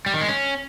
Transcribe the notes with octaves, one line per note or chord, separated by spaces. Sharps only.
G3
D#3
G#3
C#4